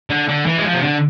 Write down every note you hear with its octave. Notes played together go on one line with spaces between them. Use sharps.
D3
D3
E3
G#3
F3
C3
D3